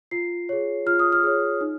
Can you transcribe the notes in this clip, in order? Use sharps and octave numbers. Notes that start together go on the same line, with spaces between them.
F4 C7
G#4 C#5
F4 F6
D#6
F6
G#4 C#5
D#4